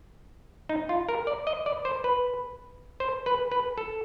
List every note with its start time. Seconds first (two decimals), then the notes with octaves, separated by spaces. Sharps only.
0.69 D#4
0.89 F4
1.09 A#4
1.27 D5
1.47 D#5
1.66 D5
1.85 C5
2.04 B4
3.00 C5
3.26 B4
3.52 B4
3.78 A4